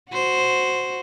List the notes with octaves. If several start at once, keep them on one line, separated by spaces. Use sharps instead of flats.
F#4 C5